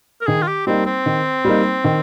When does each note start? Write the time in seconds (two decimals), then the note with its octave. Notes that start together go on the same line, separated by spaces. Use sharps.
0.21 A#4
0.27 D#3 G#4
0.42 F4
0.48 G4
0.67 G3 A#3 C4 D#4
0.86 C4
1.06 D#3
1.45 G3 A#3 D#4
1.84 D#3